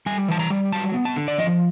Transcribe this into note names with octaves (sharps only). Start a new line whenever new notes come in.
G3 G#5
E3 A5
A#5
G3
F#3 A5
B3
A5
D3
D5
F3 D#5